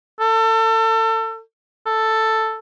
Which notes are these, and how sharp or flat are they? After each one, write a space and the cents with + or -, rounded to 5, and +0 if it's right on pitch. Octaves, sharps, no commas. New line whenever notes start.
A4 +30
A4 +5